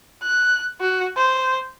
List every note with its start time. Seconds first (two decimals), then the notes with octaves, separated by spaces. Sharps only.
0.23 F#6
0.81 F#4
1.17 C5